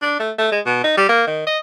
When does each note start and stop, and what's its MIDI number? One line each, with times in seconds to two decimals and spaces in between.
0.02 0.16 62
0.20 0.31 57
0.38 0.47 57
0.52 0.60 56
0.66 0.79 47
0.84 0.94 63
0.97 1.05 55
1.09 1.23 58
1.27 1.46 51
1.46 1.59 75